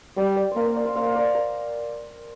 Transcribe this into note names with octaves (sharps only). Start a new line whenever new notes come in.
G3 D5 G5
D5 G5
A#3 A#4 C5 D5
C5 F5
D5 G5
C5 F5
A#3 C5 F5
F5
A#4 D5
A#4 D5